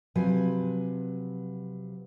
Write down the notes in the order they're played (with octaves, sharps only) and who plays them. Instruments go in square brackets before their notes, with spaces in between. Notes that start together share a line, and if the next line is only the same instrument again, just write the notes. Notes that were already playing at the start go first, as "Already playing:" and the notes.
[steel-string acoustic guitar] C3 F3 F#3 B4 G#5